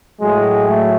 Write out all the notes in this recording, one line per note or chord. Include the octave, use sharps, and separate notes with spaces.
A2 F#3 G#3 G#4
A3